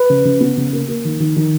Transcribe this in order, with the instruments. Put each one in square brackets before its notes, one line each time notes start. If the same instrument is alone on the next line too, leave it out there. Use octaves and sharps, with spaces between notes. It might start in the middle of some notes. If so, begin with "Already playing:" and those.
Already playing: [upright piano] B4
C#3
C#3
B3
C#3
A#3
A#3
D#3
D#3
D#3